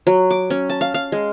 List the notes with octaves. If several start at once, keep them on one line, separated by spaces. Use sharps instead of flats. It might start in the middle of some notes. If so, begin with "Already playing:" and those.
F#3
D6
C#4
A5
F5
F5
G#3